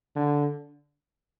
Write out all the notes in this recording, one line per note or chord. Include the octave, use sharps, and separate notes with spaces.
D3